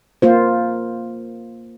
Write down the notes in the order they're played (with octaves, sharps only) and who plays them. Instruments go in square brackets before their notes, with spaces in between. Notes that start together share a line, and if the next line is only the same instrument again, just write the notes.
[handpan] A#3 F4 C5